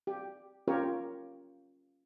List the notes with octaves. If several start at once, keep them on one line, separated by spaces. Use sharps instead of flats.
G4
C#4 F4 G4 A#4 C#5